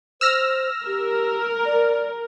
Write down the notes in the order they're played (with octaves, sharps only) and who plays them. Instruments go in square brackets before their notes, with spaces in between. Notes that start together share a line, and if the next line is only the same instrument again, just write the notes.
[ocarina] C5 [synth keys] E6 F6 A#6
[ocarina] G4 [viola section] A#4
[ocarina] D5